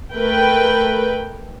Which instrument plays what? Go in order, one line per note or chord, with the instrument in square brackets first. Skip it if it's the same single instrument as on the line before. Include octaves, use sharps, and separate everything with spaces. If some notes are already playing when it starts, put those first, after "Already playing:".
[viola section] A3 A#4 B4 G5